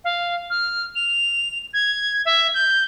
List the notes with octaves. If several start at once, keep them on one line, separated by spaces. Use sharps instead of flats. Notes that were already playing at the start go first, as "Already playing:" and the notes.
F5
F6
F7
G#6
E5
G6